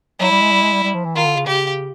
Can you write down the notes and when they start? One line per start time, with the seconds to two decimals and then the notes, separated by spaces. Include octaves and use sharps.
0.20 F#3 E4
0.31 G3
0.42 G#3
0.52 G3
0.63 G#3
0.73 G3
0.83 G3
0.94 F3
1.05 E3
1.15 D#3 F4
1.25 D3
1.36 C#3
1.47 C#3 G4